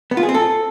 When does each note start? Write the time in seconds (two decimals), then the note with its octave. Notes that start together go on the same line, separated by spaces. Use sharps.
0.11 B3
0.17 F4
0.23 G#4
0.29 C4
0.34 A4